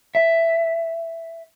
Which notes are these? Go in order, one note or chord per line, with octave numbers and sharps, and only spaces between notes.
E5